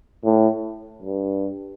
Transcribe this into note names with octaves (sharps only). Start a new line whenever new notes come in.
A2
G2